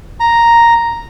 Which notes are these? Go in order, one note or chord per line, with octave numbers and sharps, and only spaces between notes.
A#5